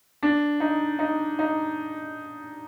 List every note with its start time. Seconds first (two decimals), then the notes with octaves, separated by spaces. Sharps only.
0.23 D4
0.60 D#4
0.99 D#4
1.39 D#4